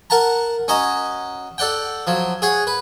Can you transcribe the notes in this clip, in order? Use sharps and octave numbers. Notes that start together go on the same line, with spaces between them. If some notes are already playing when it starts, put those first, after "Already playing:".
A#4 F#5 A5 A#5
C#4 F#4 D#5 A#5
A4 D5 F#5 G5
F3 F#3
G#4 C#5 F#5
B4